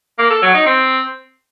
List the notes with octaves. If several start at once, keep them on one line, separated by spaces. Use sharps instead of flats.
A#3
A4
F#3
D#4
C4